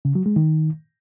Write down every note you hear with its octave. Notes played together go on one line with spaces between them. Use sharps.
C#3
F#3
G#3
D#3